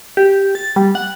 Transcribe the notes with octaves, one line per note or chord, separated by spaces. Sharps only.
G4
A6
G3
F#5